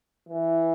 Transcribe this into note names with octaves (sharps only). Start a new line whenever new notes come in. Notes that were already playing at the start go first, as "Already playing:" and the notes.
E3